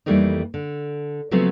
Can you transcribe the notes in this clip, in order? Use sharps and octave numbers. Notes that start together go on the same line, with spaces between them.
F2 E3 G3 A3 A#3 D#4
D3
C#3 F3 F#3 A3 B3 C4